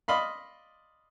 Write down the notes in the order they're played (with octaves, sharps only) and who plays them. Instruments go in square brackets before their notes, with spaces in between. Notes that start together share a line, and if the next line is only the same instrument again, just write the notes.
[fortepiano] D5 D#5 F5 B5 C6